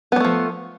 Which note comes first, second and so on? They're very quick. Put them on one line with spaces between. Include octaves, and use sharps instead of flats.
B3 G3 A3 F3